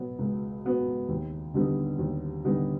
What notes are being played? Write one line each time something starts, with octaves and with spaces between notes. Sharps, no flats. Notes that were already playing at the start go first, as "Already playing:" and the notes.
Already playing: B2 F#3 B3
C#2
B2 F#3 B3
D#2
D3 G3 B3 D#4
D#2
D3 G3 B3 D#4